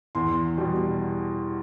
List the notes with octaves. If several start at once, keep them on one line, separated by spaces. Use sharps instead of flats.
E2 C6
B2 G3